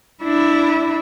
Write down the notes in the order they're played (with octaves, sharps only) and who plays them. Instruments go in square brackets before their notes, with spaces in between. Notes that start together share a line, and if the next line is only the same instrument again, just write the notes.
[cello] D4 E4